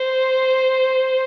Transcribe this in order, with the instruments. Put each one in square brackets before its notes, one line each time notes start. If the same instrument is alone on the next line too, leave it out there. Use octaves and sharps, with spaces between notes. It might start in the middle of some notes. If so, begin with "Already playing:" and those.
Already playing: [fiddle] C5